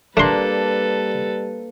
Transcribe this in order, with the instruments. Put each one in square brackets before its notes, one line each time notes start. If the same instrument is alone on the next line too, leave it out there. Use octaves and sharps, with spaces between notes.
[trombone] G3 [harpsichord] A3 C6 [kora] A#3 D4 [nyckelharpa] A4 B4